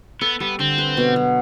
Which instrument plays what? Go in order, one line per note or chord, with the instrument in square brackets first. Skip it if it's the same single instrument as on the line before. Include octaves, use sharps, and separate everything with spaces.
[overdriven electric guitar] B3 [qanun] A4
[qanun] G3 [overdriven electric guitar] B3
[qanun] D3 [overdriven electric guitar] C4
[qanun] B4
B2
F#3